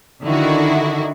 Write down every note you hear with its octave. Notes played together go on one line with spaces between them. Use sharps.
D3 D#3 E4 F#4